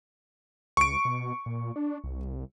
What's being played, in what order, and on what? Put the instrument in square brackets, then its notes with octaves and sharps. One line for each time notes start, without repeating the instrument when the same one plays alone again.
[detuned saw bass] C#2 [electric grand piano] C#6 D7
[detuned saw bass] B2
A#2
D4
C2